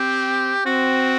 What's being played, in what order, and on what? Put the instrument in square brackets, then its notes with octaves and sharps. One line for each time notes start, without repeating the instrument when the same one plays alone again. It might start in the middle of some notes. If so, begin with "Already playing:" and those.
Already playing: [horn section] C4 [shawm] G4
[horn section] C4 [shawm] F#4